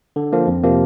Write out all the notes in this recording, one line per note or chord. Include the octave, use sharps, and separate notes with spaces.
D3
F3 A#3
F2
C3 F3 A#3